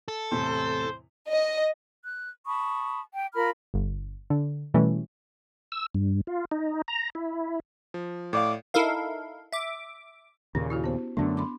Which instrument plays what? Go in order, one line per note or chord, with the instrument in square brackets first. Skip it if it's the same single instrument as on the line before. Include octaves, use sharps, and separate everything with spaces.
[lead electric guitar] A4
[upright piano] E2 A2 C3 [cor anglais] C5
[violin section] D#5
[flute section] F#6
A5 B5 C#6 D#6
G5
F4 A#4 B5 F6
[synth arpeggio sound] G1
D3
B2 E3 G3 A3 C#4
[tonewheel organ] E6
G2
F4
D#4
A#5
E4
[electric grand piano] F3
[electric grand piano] A2 D5 F5 [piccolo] D6
[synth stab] D#4 E4 A4 A#4 F5
E5 D6
[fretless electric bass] D#2 A#2 C#3 [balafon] C#4
[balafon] E4 F#4 G4
B3 C5
[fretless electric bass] F#2 D3 A3 [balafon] B3 D4
[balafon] B5 C6 D6